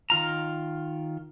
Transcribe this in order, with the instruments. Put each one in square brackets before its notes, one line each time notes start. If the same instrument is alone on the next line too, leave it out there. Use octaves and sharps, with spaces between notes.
[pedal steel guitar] D#3 F4 A#5